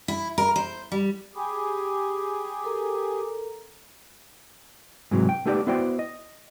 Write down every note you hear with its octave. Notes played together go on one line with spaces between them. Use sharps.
E4
A#4
C5
G3
G4 G#4 B5
A4 A#4 A#5
G#2 C3 E3 F#3
G5
A3 B3 D#4 G4 C5 D5
B3 E4 F#4 C5 D5 G5
D#5